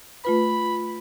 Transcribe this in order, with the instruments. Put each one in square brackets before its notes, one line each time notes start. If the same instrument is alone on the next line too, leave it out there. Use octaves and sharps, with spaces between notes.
[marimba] A3 F4 B4 [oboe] B5